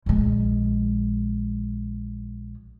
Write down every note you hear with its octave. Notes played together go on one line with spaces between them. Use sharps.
A#1 G#3